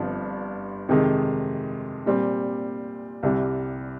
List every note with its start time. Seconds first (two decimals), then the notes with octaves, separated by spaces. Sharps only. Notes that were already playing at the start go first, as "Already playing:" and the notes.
Already playing: G1 G2 F3 C4
0.89 F2 C3 D#3 G#3 D#4
2.06 A#2 G3 C4
3.23 C2 C3 G3